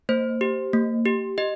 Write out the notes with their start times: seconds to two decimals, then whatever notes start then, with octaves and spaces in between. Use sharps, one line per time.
0.09 A#3 C5
0.41 G4
0.73 A#3
1.05 G4
1.38 G4 D#5